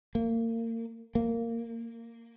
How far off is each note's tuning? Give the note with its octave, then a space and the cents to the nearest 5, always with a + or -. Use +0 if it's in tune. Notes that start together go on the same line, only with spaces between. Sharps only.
A#3 -30
A#3 -15